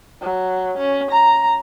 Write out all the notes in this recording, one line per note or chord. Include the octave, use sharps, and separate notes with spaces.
F#3
C#4
A#5